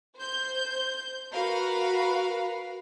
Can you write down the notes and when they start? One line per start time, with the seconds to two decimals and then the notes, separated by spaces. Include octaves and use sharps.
0.17 C5 G6
1.32 F#4 A#4 B4 F5